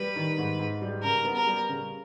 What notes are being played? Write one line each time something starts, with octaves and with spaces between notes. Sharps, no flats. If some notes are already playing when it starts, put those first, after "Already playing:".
Already playing: G3 B4
D#3
G#2
G#2
G3
C#3 A#4
B3
A#4
G3
C#3